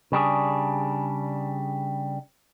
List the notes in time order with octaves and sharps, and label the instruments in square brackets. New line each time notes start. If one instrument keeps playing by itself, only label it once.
[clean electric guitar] C#3 G3 D4 G#4